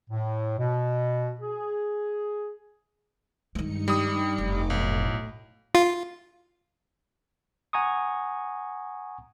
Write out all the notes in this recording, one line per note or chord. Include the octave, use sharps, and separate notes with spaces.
A2
B2
G#4
G2 D#3 G#3 D#4 C#7
G3 D#6
F1 D#4 D6
B1 A2
F4
F#5 G#5 A#5 C#6 D#6